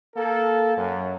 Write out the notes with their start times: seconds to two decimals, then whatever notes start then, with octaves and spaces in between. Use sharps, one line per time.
0.16 A#3 A4
0.77 F#2